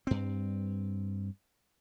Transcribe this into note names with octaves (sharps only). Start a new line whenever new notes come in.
G2 C4